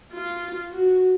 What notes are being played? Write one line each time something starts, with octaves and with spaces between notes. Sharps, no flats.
F4
F#4